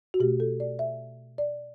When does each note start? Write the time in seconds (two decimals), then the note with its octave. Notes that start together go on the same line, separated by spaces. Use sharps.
0.14 F#4
0.20 B2 A3 G4
0.40 A4
0.60 D5
0.79 E5
1.38 D5